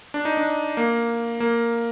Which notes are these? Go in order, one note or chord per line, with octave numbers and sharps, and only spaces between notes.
D4
D#4
D4
A#3
A#3